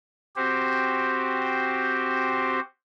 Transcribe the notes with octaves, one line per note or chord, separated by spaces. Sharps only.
C4 F#4 G4 C5